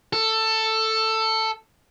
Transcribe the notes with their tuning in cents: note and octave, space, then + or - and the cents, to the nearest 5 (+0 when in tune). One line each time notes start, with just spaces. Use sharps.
A4 +10